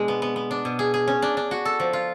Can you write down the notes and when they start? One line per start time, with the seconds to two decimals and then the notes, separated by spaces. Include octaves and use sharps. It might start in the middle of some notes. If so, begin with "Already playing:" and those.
Already playing: B2 G#3 D4
0.08 B3
0.22 B3
0.36 B3
0.51 D4
0.65 B2
0.79 G#4
0.94 G#4
1.07 C#4
1.22 D4
1.37 D4
1.51 F#4
1.65 A4
1.80 F3
1.93 F4